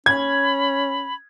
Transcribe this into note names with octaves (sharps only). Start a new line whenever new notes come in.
C#4 B5 G#6